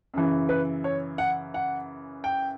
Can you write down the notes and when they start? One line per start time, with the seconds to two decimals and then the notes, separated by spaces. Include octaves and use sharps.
0.14 F#2 C#3 E3
0.49 B4
0.84 C#5
1.18 F#5
1.54 F#5
2.24 G5